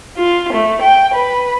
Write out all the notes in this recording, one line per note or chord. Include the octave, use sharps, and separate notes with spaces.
F4
A3
G5
B4